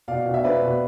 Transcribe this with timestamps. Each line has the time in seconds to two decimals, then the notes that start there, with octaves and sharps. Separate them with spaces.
0.08 B2 D5 F5
0.25 B2
0.34 E5
0.43 B2 B4 D5
0.62 B2